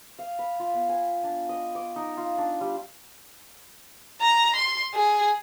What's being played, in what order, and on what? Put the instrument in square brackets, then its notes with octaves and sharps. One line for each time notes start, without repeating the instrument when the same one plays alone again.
[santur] F5
B5
F4
B3
G#5
D4
D#5
D6
D#4
F4
D4
G3
[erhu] A#5
C6
G#4